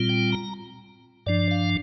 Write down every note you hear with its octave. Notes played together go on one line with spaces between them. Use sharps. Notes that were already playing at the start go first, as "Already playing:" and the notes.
Already playing: A#2 G3 C4 F4
G5
A#5
G2 F3 D4 D5
F5